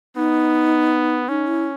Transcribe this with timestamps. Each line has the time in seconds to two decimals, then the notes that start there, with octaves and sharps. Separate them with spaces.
0.16 B3 D#4
1.29 C#4 D#4
1.47 E4